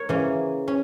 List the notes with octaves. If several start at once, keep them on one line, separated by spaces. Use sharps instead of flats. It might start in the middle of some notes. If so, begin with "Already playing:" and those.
Already playing: A#4 C#5
C#3 E3 A#3 C#4
C#4